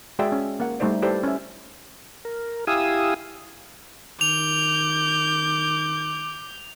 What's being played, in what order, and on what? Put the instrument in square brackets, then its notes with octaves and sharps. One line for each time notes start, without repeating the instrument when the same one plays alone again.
[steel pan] G#3 F#4 G#4 D5 E5 G5
C#4
A#3 F#5
G3 A3 D#4 C5 D5
E4 G4 A4 B4 C5 D5
C#4 E5
[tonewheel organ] A#4
E4 G4 F5 G#5 D#6 E6
[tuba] D#3 [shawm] D6 [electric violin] G6 [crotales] F7